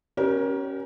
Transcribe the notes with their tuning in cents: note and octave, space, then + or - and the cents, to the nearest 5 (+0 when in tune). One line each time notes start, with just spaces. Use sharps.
C#4 -5 G4 -35 A#4 +25